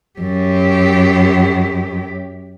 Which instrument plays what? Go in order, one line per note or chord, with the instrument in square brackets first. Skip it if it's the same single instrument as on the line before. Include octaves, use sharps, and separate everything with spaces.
[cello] F#2 G4